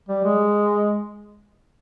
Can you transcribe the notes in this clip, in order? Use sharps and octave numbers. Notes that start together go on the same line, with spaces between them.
G3
G#3